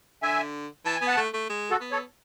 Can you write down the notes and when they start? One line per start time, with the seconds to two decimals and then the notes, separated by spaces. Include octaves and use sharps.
0.22 D3 E5 G#5
0.85 E3 A5
0.96 G#5
1.02 B3
1.07 F#5 A5
1.17 A3
1.34 A3
1.50 G#3
1.70 F#4 A4
1.81 B3
1.91 A4 C#5